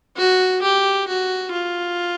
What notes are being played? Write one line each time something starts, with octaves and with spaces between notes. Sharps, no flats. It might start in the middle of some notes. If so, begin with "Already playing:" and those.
F#4
G4
F#4
F4